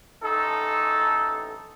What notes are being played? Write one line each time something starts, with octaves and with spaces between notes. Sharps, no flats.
A1 D#4 A4